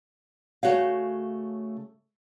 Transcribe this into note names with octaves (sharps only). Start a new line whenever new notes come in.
C#3 A3 F#4 C#5 F5